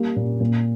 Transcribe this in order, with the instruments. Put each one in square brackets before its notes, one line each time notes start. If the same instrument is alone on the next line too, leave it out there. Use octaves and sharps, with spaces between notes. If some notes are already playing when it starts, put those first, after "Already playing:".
Already playing: [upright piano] G3 A#3
A#2
A#2